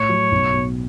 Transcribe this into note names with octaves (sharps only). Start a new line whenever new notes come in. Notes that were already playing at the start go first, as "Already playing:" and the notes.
Already playing: A2 C#5
F#3
B1
B2